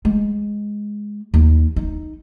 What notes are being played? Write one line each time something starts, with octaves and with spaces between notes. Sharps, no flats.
G#3
D#2
D#4